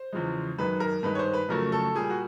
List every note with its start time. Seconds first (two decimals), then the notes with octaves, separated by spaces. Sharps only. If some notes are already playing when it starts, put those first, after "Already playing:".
Already playing: C5
0.13 E2 C#3 F3 G#3
0.58 F#2 D#3 G#3 B4
0.80 A#4
1.03 G2 D#3 G#3 B4
1.15 C#5
1.19 C5
1.33 B4
1.49 F2 C#3 F#3 A3 A#4
1.72 A4
1.95 A#2 G3 G#4
2.10 F#4